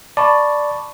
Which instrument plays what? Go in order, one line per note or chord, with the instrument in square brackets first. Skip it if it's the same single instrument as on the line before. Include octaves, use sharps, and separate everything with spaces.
[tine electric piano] D5 [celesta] A5 B5 C#6